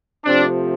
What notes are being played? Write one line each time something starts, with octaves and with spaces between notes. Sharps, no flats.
C3 F3 A3 C4 D4